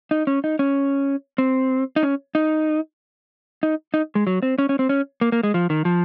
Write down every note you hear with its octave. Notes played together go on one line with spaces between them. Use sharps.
D#4
C#4
D#4
C#4
C4
D#4
C#4
D#4
D#4
D#4
G#3
F#3
C4
C#4
C#4
C4
C#4
A#3
A#3
G#3
F3
D#3
F3